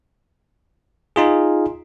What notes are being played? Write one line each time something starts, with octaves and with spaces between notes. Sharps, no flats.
D#4 F4 G#4